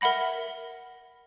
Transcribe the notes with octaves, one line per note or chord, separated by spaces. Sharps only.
A#4 E5 F#5 B5 A#6